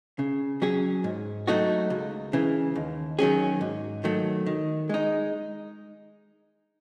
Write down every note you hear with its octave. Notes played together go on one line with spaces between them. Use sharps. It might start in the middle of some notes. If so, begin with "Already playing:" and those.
C#3
F#3 C#4 G#4
G#2
F#3 A3 D#4 F#4
C#2
C#3 E3
D#2
D#3 F#3 C#4 G#4
G#2
D#3 F#3 A3
D#3
G#3 D#4